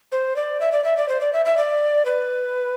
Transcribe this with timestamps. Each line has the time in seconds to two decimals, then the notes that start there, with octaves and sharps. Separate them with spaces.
0.12 C5
0.36 D5
0.60 E5
0.72 D5
0.84 E5
0.97 D5
1.09 C5
1.21 D5
1.33 E5
1.45 E5
1.57 D5
2.05 B4